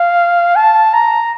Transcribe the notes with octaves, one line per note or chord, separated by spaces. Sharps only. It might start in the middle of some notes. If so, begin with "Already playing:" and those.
Already playing: F5
A5
A#5